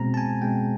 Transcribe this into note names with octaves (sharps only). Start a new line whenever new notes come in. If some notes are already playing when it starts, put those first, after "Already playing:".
Already playing: B2 G#3 C4 A#5
A5
G#5
B2 G#3 C4 G5